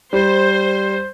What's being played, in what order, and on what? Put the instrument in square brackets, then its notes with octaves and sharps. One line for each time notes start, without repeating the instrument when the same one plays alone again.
[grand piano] G3 [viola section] C5